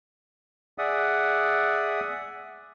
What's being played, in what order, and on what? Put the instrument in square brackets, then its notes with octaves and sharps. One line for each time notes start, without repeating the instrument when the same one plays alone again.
[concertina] G#4 D5 E5 F#5 D#6